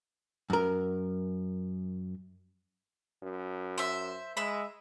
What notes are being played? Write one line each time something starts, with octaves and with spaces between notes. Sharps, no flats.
F#2 A#4
F#2
C5 E5
G#3 E5 B5